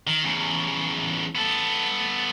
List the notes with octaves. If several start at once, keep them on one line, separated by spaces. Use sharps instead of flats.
D#3
E2 C#3
B3 A4